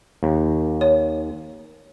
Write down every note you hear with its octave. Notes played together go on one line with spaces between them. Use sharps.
D#2
C#5